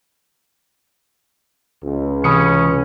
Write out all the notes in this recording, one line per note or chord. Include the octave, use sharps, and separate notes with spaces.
C#2
C3 E3 C#4 B5 D#6 C#7